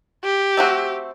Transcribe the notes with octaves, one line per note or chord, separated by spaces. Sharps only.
G4
A3 C4 F#4